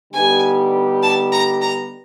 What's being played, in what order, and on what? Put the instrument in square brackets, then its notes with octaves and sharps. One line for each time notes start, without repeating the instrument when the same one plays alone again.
[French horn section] D3 G3 B3 D#4 G4 [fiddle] G#5
[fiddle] A5
A#5
A#5